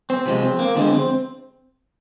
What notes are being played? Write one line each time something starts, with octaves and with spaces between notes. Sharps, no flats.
C4
C3 F3 G#3
C4
A#3
D3 F3 G#3 C4
C4